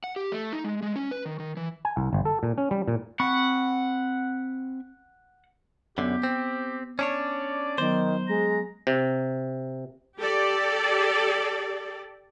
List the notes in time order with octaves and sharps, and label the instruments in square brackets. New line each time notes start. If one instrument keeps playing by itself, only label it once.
[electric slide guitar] F#5
G4
A3
D#4
G#3
G#3
C#4
B4
D#3
D#3
E3
[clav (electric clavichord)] G#5
C2
G1
A4
A#2
C#4
G3
A#2
[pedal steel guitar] C4 B5 C#6 [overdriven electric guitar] F#5
[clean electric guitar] F#2 D3 [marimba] B3 [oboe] G4
[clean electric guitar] C4
[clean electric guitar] C#4 D4 C#5 [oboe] D5
[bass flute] D#3 [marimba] F#3 B3 [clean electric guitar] C5
[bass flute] G#3 [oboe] A#5
[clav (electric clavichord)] C3
[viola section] G4 A4 D5